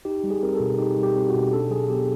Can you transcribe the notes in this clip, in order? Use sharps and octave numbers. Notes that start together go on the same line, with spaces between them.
D#4 G4
G3
G#4
C4 A#4
A4
B2
D#4 G4
G3
G4
C4
F#4
B2
D4 A4
F#3 G#4
B3 G4